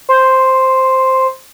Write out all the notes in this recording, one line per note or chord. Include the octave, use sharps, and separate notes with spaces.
C5